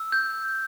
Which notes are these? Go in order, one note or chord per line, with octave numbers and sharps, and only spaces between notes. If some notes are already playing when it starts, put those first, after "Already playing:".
Already playing: E6
G6